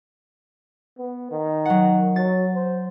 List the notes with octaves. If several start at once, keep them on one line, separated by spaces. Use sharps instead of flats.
B3
D#3
F#3 F#5
F#3 A6
C5